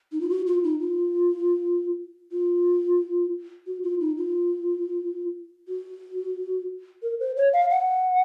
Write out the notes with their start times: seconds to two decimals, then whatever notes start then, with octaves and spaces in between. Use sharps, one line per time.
0.12 D#4
0.21 F4
0.30 F#4
0.47 F4
0.63 D#4
0.80 F4
2.32 F4
3.67 F#4
3.83 F4
4.00 D#4
4.17 F4
5.68 F#4
7.03 A#4
7.20 C5
7.37 C#5
7.53 F5
7.71 F#5